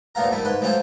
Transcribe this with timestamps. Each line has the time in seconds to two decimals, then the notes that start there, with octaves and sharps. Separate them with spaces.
0.15 A#1 E2 A3 B3 F5 A#5
0.32 G2 D#3 A3 E4
0.44 G#2 B4 C6
0.61 A2 E3 F#3 F4 G#4 C5